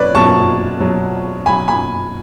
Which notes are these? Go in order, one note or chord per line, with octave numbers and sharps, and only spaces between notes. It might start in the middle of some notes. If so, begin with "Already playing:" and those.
Already playing: B2 F#3 B4 C#5 D5
B2 F#3 A5 C#6
B2 F#3
B2 F#3 G#5 B5
G#5 B5